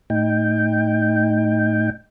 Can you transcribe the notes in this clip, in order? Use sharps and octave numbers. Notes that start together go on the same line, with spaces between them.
A2 D#4 G5